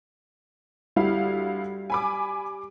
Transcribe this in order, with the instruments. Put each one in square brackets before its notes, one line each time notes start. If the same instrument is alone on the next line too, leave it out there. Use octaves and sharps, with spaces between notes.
[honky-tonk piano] D2 E4 F5 [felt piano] G3
[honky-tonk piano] G#5 B5 D6